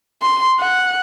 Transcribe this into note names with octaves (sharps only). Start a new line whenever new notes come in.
C6
F#5